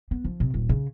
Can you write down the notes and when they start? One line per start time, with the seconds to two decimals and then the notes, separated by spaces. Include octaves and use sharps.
0.11 B3
0.24 F3
0.40 C3
0.54 D#1
0.69 C#3